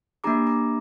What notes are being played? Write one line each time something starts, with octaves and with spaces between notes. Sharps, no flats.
A#3 D4 G4 A#5 D6
A#5 D6